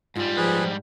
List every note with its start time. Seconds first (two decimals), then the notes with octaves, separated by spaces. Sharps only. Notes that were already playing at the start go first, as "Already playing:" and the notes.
0.16 G#2 G3 F4
0.37 F3 G#4 B4